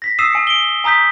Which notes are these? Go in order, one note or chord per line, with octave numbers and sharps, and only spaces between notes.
A#6 B6
D#6 E6 C7 D#7 E7
G#5 C#7
D7 G7
G#5 A#5 D#6 G6 B6